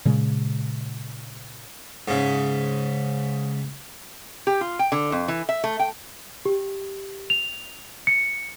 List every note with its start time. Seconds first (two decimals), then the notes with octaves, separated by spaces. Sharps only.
0.05 A#2 C#3 G#3
2.08 G#2 C#3
4.47 G4
4.61 F4
4.79 G5
4.92 D3
5.12 F2
5.28 E3
5.49 E5
5.64 A3
5.79 G5
6.46 G4
7.30 F7
8.07 C#7